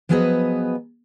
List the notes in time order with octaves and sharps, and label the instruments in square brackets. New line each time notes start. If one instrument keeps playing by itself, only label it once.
[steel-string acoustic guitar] F3 F#3 B3 G#4 B4 D#5